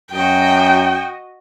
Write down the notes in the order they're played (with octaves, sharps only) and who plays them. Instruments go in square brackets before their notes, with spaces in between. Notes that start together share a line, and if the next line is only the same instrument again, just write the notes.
[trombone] F#2 [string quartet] F#4 D#5 [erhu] G5